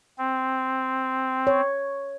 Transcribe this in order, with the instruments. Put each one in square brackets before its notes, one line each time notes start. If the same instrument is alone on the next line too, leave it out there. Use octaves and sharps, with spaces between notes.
[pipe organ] C4
[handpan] C#5